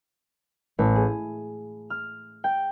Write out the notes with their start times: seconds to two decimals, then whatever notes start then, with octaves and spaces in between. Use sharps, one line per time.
0.79 A1
0.95 G#4
1.90 F6
2.44 G5